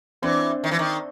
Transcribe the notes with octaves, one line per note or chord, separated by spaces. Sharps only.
E3 C4 D4
D#3
E3
D#3